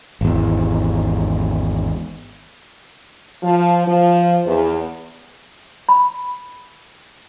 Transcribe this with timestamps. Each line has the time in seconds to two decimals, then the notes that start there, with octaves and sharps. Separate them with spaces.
0.21 G#1 E2
3.42 F3
3.86 F3
4.45 E2
5.89 B5